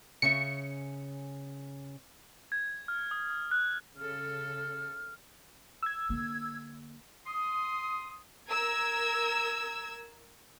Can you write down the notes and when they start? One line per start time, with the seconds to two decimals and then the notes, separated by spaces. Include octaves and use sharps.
0.22 C#3 C#4 E5 C#7
2.52 G#6
2.88 F6
3.11 D#6
3.30 D#6
3.51 F#6
3.97 C#3 A4 F6
5.83 E6 G#6
6.09 D3 A#3
7.27 C6 D#6
8.49 A#4 E6 G#6